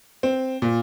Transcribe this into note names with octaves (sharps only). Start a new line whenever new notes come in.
C4
A#2